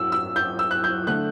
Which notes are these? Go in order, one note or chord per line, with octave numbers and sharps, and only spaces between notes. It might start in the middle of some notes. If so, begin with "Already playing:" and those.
Already playing: F#2 E6
E6
G6
E6
F#6
G6
D3 A3 F#6